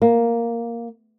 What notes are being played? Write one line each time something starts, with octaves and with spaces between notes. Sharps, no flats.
A#3